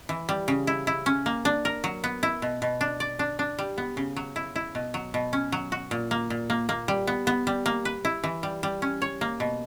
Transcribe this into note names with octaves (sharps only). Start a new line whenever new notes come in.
E3
G3
C#3
E4
E4
C#4
A#3
D4
A#4
F#3
B3
E4
B2
B2
D4
D5
D4
D4
G3
B3
C#3
F#3
E4
E4
B2
F#3
B2
C#4
F#3
F#4
A#2
A#3
A#2
A#3
A#3
G3
B3
B3
G3
A#3
B4
E4
E3
G3
G3
C#4
C#5
A#3
B2